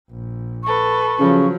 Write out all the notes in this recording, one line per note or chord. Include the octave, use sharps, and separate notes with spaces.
A#1
A4 B4 C#6
C#3 F3 F#3